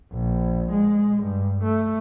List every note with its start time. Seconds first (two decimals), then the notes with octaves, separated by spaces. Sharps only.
0.13 A#1
0.72 G#3
1.24 G2
1.63 A3